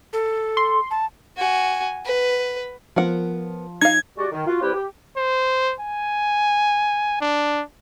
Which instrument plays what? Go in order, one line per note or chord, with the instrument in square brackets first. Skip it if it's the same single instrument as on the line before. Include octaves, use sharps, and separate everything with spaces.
[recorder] A4
[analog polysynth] C6
[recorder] A5
[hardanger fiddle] F#4 G#5
B4
[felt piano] F3 [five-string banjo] B3 A#4 F#5
[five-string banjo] D#4 F5 [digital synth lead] G#6
[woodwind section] G#3 F#4 G4 D5
D#3
F4 F#4
G3 C4 E4 G4 B4
G4
[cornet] C5
G#5
D4